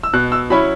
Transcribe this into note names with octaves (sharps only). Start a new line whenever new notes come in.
E6
B2 F#6
E6
F#3 C#4 E4 B5